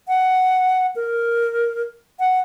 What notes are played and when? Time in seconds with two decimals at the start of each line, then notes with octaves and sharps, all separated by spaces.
0.08 F#5
0.96 A#4
2.19 F#5